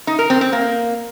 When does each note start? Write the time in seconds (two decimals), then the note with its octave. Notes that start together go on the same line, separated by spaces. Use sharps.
0.07 D#4
0.19 A#4
0.30 C4
0.41 C4
0.52 A#3